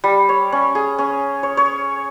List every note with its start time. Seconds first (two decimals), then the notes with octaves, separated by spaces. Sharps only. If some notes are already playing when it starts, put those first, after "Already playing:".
0.04 G3
0.29 C#5
0.52 C#4
0.75 G#4
0.98 C#4
1.43 C#5
1.57 C#5